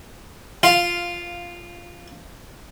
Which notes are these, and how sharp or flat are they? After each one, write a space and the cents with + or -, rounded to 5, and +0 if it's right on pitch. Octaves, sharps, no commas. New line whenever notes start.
F4 -5 F5 +0